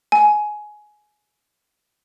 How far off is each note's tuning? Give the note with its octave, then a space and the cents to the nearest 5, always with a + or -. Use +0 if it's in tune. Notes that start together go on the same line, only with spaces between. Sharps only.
G#5 +15